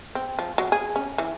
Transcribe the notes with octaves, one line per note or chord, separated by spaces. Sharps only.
C4
F3
F#3
G#4
C#4
E3